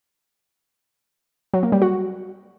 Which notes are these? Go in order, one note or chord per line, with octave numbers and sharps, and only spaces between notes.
F#3
A#3
G3
F#4